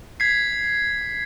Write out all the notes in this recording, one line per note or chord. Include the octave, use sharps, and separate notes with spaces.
G#6 B6 C7